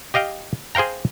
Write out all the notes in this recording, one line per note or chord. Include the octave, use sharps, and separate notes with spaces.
G4 D#5 F5 G5
G#4 C5 F5 G5 A#5